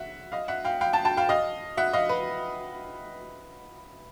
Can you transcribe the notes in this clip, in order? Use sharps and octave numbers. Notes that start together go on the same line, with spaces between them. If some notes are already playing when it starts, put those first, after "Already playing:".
Already playing: E5 F#5
D#5 F5
E5 F#5
F5 G5
F5 G5
G5 A5
G5 A5
F5 G5
D#5 F5
E5 F#5
D#5 F5
B4